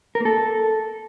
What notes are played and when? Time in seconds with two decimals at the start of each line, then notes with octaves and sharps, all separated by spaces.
0.15 A#4
0.20 A#3
0.25 A4